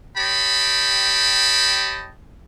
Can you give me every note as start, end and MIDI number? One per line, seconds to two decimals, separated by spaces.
0.17 2.10 67
0.17 2.10 73
0.17 2.10 75
0.17 2.10 79
0.17 2.10 81
0.17 2.10 83